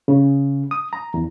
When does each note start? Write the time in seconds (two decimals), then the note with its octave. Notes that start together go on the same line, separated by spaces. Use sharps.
0.08 C#3
0.71 D#6
0.93 A#5
1.14 E2